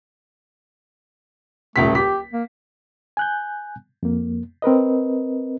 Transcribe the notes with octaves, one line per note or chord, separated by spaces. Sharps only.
D#1 C#2 A3 B6
G4 B6
A#3
G#5 F#6 G6
F2 A#3
C4 A#4 B4 D#5